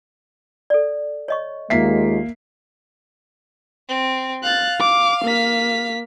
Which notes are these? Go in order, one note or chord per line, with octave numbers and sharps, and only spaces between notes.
A4 D5
C#5 D#5 C#6
D#2 G#3 A#3 F4 E5 B6 C7
C4
F5 F#6 A6
D6
A#3 B6